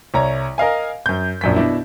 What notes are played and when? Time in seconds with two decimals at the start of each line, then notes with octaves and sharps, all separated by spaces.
0.14 C2 C#5 A#5
0.58 A#4 D#5 F5 G#5
1.06 F#2 G6
1.41 A#1 F#2 B6
1.56 B2 D4 E4